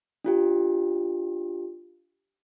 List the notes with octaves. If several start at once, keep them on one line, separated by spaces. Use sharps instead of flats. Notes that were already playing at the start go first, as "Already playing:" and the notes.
D4 F4 G4